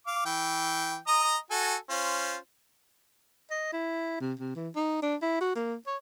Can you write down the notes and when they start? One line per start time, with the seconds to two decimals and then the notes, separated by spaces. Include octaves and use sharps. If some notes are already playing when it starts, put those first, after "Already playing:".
0.07 F5 D6
0.26 E3 G5
1.07 D#5 A#5 D#6
1.51 F#4 A4 G#5
1.90 C#4 F4 C5
3.51 D#5
3.73 E4
4.20 C3
4.39 C3
4.56 E3
4.76 D#4
5.02 D4
5.22 E4
5.41 F#4
5.55 A#3
5.87 C#5